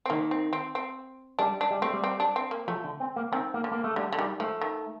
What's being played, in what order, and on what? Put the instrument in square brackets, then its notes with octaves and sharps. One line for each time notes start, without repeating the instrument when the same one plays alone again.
[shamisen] C4
[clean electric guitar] D#3 [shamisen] A#3
[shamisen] C4
C4
C4
[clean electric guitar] G3 [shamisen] D4
[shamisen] D4
[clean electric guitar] G3
[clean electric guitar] A3 [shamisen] C4
[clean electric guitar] G3
[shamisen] C4
D4
C4
A#3
[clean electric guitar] F3 [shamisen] A3
[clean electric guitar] D3
C4
A#3
[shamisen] D#3 [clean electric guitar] C4
[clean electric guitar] A#3
[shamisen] D3
[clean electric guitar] A#3
A3
[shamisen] D3 [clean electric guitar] G3
[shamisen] D3
[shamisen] D#3 [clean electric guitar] G3
[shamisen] F3 [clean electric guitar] A3
[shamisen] D#3